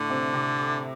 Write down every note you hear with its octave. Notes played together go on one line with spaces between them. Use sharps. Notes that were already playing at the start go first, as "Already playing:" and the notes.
Already playing: A2 D3 A3
C3 C4
C3 C4